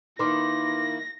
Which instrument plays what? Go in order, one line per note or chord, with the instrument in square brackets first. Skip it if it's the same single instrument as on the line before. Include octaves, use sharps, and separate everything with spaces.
[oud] D#3 D#4 [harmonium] A#3 E4 [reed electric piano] B4 C6 D6 [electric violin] A#6